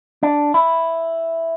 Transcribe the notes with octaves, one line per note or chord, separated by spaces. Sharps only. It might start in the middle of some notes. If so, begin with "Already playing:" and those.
D4
E4